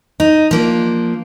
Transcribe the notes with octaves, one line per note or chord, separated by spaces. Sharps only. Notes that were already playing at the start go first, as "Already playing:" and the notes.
D#4
F3 A#3 D4